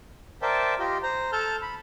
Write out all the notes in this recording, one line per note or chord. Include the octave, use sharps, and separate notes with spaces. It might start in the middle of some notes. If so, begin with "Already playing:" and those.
A#4 C5 D5 E5 G5 A5
F4 G4 D#5
C5 A#5
A4 A5 F6 G6
B5